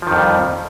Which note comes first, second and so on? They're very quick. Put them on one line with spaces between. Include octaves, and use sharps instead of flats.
F3 D#3 F2 G3